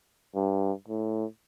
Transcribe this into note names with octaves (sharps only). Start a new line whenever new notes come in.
G2
A2